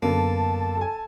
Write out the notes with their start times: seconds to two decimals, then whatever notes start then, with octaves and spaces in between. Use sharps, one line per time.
0.02 F#2 D3 A#3 B3 A5
0.77 A4 G#5